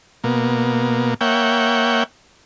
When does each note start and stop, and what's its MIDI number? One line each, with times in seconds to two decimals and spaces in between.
0.24 1.14 47
0.24 1.14 58
1.21 2.04 58
1.21 2.04 73
1.21 2.04 76
1.21 2.04 78
1.21 2.04 79